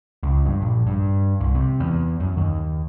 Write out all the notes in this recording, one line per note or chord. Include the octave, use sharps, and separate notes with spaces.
C#2
G2
A#1
G2
C2
C3
E2
F#2
D#2